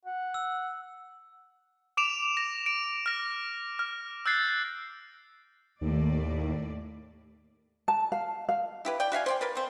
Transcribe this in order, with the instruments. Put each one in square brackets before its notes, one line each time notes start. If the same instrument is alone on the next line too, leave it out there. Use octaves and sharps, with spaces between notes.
[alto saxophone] F#5
[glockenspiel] E6
[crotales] D6 D7 E7 F7
A#6
D7
F6 A#6
F6
E6 F#6 G6 A6 C7
[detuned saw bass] D#2 [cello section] A2 D5
[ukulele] A5
F5
F5
[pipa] E4 G4 B4
D5 G5
F#4 E5 F5 G#5
C5 D5 G5
A#4 B4 D5
B2 C4